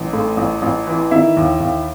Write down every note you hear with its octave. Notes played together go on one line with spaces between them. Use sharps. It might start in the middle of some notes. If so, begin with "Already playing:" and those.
Already playing: A1
A2
A1
A1
E3
D#3 E4 E5
D#2
D#2